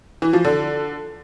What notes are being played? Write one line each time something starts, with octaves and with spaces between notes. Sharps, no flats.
E3
F3
D3